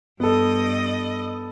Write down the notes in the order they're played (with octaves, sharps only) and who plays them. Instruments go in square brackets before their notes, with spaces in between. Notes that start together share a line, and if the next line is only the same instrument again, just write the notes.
[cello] G2 D#5 [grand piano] B3 A4